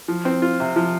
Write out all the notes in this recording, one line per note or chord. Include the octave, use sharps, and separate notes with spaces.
F3
C4
F4
C3
F3